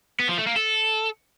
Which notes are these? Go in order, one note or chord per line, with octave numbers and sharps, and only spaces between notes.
B3
F3
A3
A#3
A4